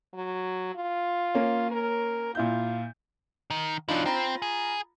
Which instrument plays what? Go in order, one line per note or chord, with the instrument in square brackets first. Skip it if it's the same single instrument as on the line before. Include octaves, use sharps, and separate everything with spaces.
[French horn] F#3
F4
[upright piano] A#3 C#4
[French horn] A#4
[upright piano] A#2 E4 G6 [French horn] F4
[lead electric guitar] D#3
[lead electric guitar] E3 F#3 [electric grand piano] D4 D#4 F4
[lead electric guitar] C4 [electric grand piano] F4 A#5 B5
[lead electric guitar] G#4